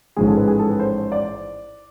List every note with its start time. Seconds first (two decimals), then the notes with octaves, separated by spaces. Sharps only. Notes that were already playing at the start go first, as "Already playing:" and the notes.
0.16 A1 G#2 F3 G#3 G#4
0.27 A4
0.37 B4
0.47 G#4
0.59 A4
0.69 B4
0.80 C5
1.12 D5